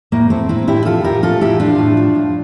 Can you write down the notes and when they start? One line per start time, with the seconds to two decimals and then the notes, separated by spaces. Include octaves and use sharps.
0.12 A2 A#3
0.30 A2 A3 C4
0.49 A2 C4 E4
0.67 A2 E4 G4
0.85 F3 F4 A4
1.04 A2 G4 A#4
1.23 F3 F4 A4
1.41 A2 E4 G4
1.59 F3 D4 F4
1.78 A2
1.97 F3
2.15 A2